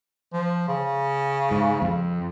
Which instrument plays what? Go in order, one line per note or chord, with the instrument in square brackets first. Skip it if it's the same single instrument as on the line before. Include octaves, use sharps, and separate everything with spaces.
[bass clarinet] F3
C#3
[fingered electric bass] G#2
F2